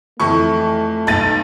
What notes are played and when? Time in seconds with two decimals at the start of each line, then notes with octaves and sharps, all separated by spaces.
0.20 F2 E3 A3 C#6
1.07 B1 A6 D#7